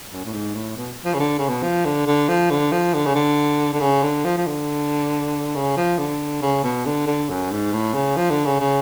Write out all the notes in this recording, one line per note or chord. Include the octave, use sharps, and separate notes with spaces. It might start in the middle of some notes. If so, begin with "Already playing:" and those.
F#2
A2
G#2
A2
B2
F3
C#3
D3
C#3
B2
F3
D3
D3
F3
D3
F3
D3
C#3
D3
D3
C#3
D3
F3
F3
D3
C#3
F3
D3
C#3
B2
D3
D3
F#2
G#2
A2
C#3
F3
D3
C#3
C#3